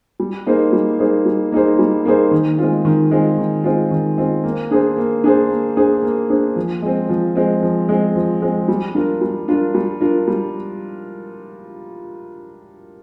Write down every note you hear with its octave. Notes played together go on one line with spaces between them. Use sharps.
G3
A#3 D#4 G#4 C5
G3
A#3 D#4 G#4 C5
G3
A#3 D#4 G#4 C5
G3
A#3 D#4 G#4 C5
D#3
G#3 C4 F4
D#3
G#3 C4 F4
D#3
G#3 C4 F4
D#3
G#3 C4 F4
A#3
D4 G#4 C5
A#3
D4 G#4 C5
A#3
D4 G#4 C5
A#3
D4 G#4 C5
F3
G#3 C4
F3
G#3 C4
F3
G#3 C4
F3
G#3 C4
G3
D4 F4 A#4
G3
D4 F4 A#4
G3
D4 F4 A#4
G3